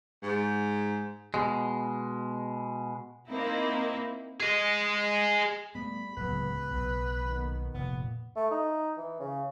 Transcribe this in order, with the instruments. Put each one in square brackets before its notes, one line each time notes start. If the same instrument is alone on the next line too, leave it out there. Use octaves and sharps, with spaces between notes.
[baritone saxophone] G#2
[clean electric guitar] B2 G#3
[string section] A#3 C4 D#4 E4
[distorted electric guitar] G#4 D#5
[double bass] G3 [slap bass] A3 B3 [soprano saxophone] B5
[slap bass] D1 F#3 [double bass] C#2 B3 [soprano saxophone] B4
[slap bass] B1 F#3 [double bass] B3
[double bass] D#3 B3
[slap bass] F1 [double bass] A#2 [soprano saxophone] B3
[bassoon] A3
D#4
E3
C#3